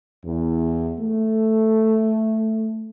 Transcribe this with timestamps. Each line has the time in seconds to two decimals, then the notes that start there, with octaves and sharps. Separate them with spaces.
0.25 E2
0.99 A3